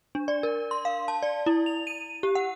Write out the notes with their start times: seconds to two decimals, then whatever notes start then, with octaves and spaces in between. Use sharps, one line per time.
0.15 D4
0.28 D5
0.43 A#4
0.71 C6
0.85 F5
1.08 A5
1.23 D5
1.46 E4
1.66 F7
1.87 D#7
2.23 G4
2.35 F#5